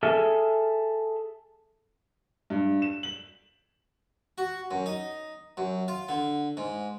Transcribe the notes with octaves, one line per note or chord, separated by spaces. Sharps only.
G#4 A4 E5 F6
G2
E7
F#7
F#4
F#2
D#4
F#2
F4
D3
G#2